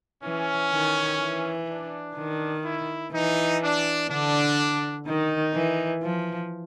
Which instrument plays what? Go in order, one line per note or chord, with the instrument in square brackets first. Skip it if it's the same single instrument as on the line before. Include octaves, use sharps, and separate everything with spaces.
[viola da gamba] E3 [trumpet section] C#4
[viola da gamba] D#3
E3
[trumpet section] D4
[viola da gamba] D#3
[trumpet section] E4
[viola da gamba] E3 [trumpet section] D#4
[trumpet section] D4
[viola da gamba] D3 [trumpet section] D4
[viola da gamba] D#3 [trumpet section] D#4
[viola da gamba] E3
F3